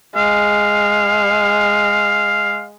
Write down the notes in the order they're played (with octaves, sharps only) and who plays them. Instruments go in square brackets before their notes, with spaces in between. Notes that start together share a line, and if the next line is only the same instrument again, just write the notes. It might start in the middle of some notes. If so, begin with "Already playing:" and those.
[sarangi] G#3 [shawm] F5